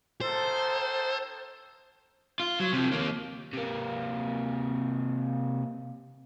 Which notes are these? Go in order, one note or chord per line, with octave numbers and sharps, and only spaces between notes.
C#2 D#3 A4 C5
F4
F#3
C3 F3
D#2 A#3
C3 A#3